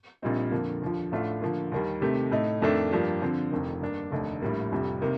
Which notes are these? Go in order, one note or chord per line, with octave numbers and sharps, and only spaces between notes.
A#1 A#2 G3 C4 D#4
F2 D3 F3 A#3
D#2 D3 F3
A1 A2 A3 D4 F4
D3 F3 A#3
D#2 D#3 G3
C3 D#3 A3 C4 G4
A2 A3 D#4
F2 D#3 A3 D4 A4
G2 F3 A#3 D4 G4
D3 F3 C4
F1 F2 D#3
G2 D#3 A#3 D4
F1 D#2 D3 A3 D#4
A#1 A2 G3 A#3
F1 F2 C3 G3
C3 D#3 A#3